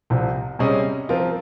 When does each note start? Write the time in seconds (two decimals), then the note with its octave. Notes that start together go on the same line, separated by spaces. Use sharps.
0.10 C2 C3 F3
0.59 C3 G3 C#4 G#4 D#5
1.09 F3 C4 F4 A#4